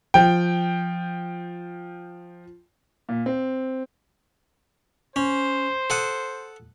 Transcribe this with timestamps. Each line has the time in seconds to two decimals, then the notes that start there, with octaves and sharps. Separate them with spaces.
0.14 F3 G5
3.09 A#2
3.26 C4
5.16 C#4 C5
5.90 A4 F#5 D#6